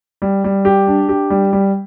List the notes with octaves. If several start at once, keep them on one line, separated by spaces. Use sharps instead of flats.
G3
G3
G4
D4
G4
G3
G3